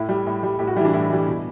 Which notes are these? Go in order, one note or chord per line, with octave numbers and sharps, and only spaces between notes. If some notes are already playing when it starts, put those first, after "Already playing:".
Already playing: A2 E4
G3
A2
G3
A2 G4
F#4
E3 G3 D4 E4
A2 E4
E3 G3
B2